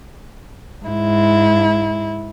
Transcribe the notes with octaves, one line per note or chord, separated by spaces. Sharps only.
G#2 E4